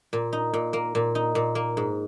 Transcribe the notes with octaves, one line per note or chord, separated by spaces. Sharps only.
A#2
D#4
A#2
A#3
A#2
D#4
A#2
A#3
G#2